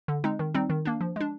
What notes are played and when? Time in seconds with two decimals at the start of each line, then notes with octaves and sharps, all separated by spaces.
0.08 D3
0.24 G#3 C4 D#4
0.39 D#3
0.55 G3 C4 D#4
0.70 D#3
0.85 A#3 D4
1.01 F3
1.16 G#3 D4